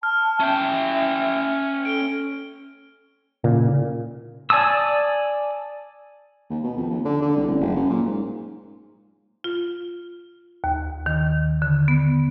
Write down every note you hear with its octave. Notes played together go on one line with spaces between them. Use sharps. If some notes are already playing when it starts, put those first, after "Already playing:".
A5 F6
C#4 E5 G5
A4 D7 G7
A#2 C#3
D5 G#5 A5 D#6 E6
D#2
B2
F2
D#2
D3
D3
C2
A1
F#1
F#2
A#2
G#2
F4
D#2
D#3
D3
B3